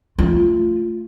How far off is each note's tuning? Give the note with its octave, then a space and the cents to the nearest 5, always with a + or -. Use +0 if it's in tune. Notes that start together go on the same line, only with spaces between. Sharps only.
A3 +0 F4 -10